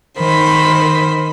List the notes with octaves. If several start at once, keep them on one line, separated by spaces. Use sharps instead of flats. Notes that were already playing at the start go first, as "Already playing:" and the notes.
D#3 C5 B5